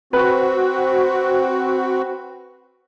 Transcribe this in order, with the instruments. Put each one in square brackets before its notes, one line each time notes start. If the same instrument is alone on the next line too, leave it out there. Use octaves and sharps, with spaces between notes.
[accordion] C4 F#4 [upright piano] B4 F#6